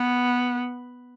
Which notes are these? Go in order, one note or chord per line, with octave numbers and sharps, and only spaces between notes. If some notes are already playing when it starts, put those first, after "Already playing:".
Already playing: B3